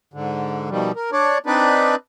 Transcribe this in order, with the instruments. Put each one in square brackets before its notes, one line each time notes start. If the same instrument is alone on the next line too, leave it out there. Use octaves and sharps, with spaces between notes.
[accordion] G#2 D3
B2 D#3 F3 G3
A#4
D4 C#5 D5
C4 D4 D#4 B4 D5